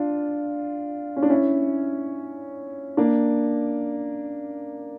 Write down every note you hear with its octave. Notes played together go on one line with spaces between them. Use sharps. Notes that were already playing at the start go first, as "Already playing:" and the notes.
Already playing: D4 F4
C#4
D4
C#4 E4
A#3 D4